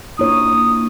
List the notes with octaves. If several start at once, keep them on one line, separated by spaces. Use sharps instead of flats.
A#3 D4 E4 F4 C#5 D#6